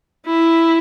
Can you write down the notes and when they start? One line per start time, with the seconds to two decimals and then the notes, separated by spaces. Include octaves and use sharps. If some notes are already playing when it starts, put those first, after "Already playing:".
0.26 E4